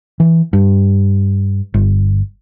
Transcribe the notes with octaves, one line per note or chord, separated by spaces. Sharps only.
E3
G2
G1